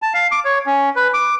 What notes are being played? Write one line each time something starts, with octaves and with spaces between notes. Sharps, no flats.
A5
F5
D6
C#5
C#4
B4
D6